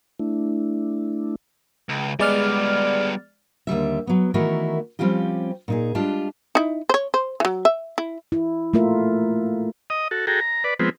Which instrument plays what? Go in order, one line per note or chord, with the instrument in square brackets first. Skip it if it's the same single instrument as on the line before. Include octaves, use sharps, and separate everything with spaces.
[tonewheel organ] A3 D4 E4
[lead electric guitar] C#2
[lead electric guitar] G3 B3 [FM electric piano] G#3 D5 F6
[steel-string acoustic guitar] D#2 D3 G3 E5
F#3 B3
D#3 E3 A3 E4 F#4 A#4
F3 G3 C4 C#4 F4 G4
A#2 D#4 G#4
G3 G#3 D4 F4 G4 A5
[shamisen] D#4 E4
C5 C#5
C5
E3 F#3
E5
E4
[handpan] E4
A3 A#3 F4 A#4 E5
[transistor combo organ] D#5 D#6
F#4 A4
F#4 G#4 A4 G5 A#5
A#5
B4 D5
F3 G#3 B3 C4